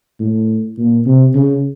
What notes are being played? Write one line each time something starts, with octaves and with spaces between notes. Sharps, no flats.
A2
A#2
C3
C#3